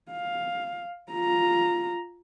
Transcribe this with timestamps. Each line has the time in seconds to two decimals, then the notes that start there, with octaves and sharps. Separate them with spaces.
0.11 F5
1.12 F4 A#5